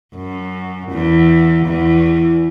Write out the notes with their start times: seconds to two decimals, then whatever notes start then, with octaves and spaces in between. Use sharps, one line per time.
0.16 F#2
0.91 E2
1.66 E2